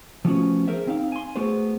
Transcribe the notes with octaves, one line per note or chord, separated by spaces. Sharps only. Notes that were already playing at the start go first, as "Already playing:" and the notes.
F3 G3 A3 B3 C#4 F#4
G#4 A#4 C5 E5
C4 D#4 F5
G#5 C6
A3 B3 F#4 G#4 C5